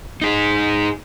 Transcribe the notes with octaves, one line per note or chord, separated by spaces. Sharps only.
D#4 G#4